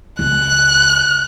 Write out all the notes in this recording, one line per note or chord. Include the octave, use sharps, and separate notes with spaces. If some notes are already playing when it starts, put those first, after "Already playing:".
C#2 F#6